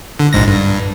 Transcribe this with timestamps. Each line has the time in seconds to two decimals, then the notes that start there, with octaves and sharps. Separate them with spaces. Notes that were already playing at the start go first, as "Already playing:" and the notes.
0.19 D3
0.33 A#1 G#2 A#6
0.48 G2